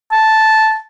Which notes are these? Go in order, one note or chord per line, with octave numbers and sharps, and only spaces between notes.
A5